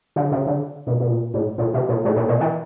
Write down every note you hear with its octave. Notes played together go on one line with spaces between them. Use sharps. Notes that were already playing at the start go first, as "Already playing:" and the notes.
D3
C#3
D3
B2
B2
A#2
A2
A#2
C3
A#2
A2
A#2
B2
E3